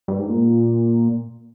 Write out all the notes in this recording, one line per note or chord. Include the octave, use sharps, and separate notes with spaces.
G2
G#2
A#2